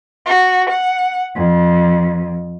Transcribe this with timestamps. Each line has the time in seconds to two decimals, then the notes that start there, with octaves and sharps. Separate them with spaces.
0.25 F#4
0.69 F#5
1.35 F2